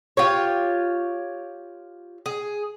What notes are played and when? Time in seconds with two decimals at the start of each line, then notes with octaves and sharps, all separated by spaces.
0.17 F4 G4 C#5
2.26 G#4